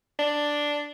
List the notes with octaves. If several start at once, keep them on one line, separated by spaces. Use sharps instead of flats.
D4